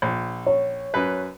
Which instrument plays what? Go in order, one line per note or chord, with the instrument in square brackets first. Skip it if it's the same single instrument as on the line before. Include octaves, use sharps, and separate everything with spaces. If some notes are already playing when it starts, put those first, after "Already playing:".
[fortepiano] A#1
[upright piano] C#5
[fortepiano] F#2 B4